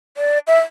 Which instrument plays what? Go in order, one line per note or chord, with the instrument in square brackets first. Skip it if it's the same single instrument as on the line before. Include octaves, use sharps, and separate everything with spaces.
[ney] D5
E5